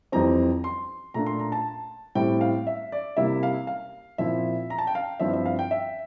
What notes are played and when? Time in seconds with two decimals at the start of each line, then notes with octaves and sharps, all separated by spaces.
0.12 F2 E3 G3 C4 A#5
0.64 C6
1.14 A#2 A3 D4 A#5
1.26 C6
1.39 A#5
1.52 A5
2.15 A2 G3 C4 E4 G5
2.41 F5
2.67 E5
2.92 D5
3.17 C3 G3 A#3 E4 E5
3.43 F5
3.67 F5
4.18 A#2 F3 C4 E4 E5
4.70 A#5
4.78 A5
4.87 G5
4.95 F5
5.20 G2 F3 C4 E4 E5
5.33 E5
5.46 F5
5.59 G5
5.71 E5